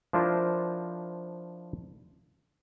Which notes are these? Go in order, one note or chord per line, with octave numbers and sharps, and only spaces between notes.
F3 D4 E4 F4 A#4 C5